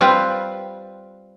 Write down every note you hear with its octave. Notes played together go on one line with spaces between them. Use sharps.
G3 C4 F4 B4